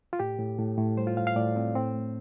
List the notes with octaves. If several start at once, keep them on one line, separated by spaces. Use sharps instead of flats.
F4
A2 G4
A2
A2
A2
G3 C5
F4
A2 F5
F5
A2 D5
A2 C4
A2 C4
A3